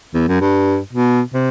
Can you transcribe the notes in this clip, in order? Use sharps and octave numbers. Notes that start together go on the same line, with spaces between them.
E2
F#2
G2
B2
C3